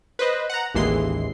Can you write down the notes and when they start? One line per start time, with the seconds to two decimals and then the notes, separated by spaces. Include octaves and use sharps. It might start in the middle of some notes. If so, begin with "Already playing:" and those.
0.19 B4 C5 D#5
0.50 F#5 A#5
0.75 A1 D#2 E3 G#3 C6 C7